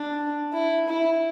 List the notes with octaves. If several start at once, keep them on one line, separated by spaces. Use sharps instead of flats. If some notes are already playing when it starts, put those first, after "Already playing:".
Already playing: D4
E4
E4